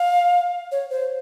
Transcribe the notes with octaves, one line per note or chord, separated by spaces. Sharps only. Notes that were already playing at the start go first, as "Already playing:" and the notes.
Already playing: F5
C#5
C5